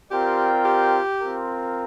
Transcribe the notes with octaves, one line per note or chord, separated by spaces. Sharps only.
C4 F4 G4 A#4 D5 G5
G4
C4 F4 A#4